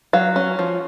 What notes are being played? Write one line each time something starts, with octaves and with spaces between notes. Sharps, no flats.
F#3 F5
C#4
F3